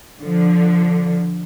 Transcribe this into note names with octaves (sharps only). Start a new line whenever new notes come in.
D3 F3